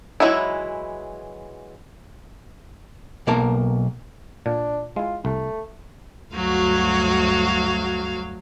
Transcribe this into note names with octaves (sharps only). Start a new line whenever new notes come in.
E3 F#3 G#3 D#4 E4
B1 A#3 A#4 A5
A#2 D4
G#3 E4 F4
C2 A3
D2 G2 F#3 F#4 F5